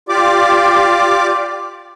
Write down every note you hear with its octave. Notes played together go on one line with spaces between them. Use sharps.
F4 G4 D5 D6